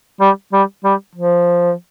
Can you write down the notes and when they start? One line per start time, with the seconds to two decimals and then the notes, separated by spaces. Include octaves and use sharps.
0.21 G3
0.53 G3
0.85 G3
1.15 F3